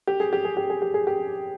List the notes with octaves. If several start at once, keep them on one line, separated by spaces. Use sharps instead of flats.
G4
G#4
G4
G#4
G4
G#4
G4
G#4
G4